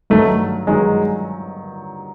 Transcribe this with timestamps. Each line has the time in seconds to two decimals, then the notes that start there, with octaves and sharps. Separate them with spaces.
0.10 G2 D#3 F#3 A3
0.67 G2 D#3 F#3 G#3